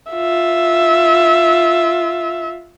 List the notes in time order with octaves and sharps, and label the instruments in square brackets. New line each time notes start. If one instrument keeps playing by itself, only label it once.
[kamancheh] F4 E5